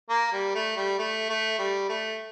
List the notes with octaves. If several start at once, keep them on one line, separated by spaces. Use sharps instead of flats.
A#3
G3
A3
G3
A3
A3
G3
A3